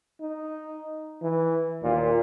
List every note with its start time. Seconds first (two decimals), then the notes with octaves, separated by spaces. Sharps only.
0.21 D#4
1.22 E3
1.83 D#2 A#2